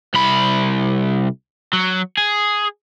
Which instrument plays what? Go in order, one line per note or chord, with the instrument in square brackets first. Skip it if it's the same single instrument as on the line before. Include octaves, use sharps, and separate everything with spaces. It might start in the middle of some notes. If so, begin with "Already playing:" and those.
[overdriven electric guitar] C2 B5
F#3
G#4